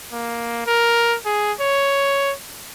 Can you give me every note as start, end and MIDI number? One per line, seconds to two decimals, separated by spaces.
0.13 0.65 58
0.67 1.16 70
1.25 1.53 68
1.60 2.33 73